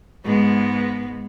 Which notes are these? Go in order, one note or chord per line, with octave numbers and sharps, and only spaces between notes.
G#2 G#3 B3